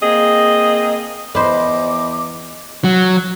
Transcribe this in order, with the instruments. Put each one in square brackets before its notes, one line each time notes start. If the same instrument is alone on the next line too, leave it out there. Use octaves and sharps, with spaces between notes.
[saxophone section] A#3 C4 G#4 D#5
[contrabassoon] E2 [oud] B4 C5 [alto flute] D#5 [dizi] D6
[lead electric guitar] F#3